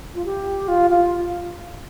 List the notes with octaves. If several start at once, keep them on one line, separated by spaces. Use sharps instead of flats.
F4
G4
F4
F4